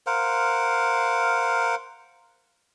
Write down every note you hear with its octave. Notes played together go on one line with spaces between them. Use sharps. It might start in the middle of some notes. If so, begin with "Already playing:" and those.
A#4 C5 F5 F#5